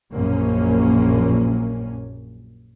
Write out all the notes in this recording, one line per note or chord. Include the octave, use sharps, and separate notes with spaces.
A#1 F#2 A#3 C#4